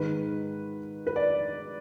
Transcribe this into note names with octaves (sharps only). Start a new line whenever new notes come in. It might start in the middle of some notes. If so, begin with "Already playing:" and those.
Already playing: G#2 D#3 B4
B4
D5